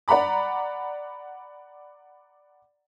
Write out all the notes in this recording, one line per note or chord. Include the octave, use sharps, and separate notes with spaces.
D5 F#5 A#5 B5 D6